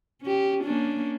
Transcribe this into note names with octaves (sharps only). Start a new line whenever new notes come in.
C#4 G4
A#3 C#4 D4